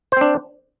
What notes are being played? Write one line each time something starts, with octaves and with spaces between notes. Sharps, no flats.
C4 D4 C5